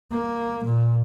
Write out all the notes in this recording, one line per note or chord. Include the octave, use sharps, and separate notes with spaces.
A#3
A#2